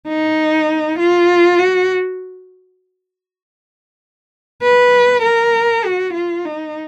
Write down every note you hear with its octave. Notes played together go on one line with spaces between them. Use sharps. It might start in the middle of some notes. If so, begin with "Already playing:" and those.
D#4
F4
F#4
B4
A#4
F#4
F4
D#4